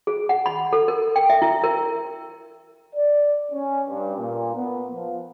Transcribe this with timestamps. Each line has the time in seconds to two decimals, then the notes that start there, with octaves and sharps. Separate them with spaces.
0.07 G#4
0.29 F#5
0.46 B5
0.73 A4
0.88 A#4
1.16 G5
1.30 E5
1.42 E4
1.64 A#4
2.95 D5
3.52 C#4
3.88 G2
4.17 A#2
4.55 B3
4.92 F3